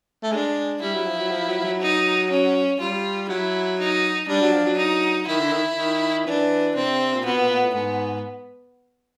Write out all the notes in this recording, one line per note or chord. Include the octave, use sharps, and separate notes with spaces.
A3
G#3 D4
G3 E4
F#3
F3
F#3
F3
F#3
F3
F#3
D#4
C#4
G3 F4
F#3 E4
D#4
G3 D4
F#3
F3
F#3
D#4
D#3 E4
D3
D#3
D#3
E3 D4
C3 C4
A#2
B2 B3
A#2
A#2
A2
G#2 B3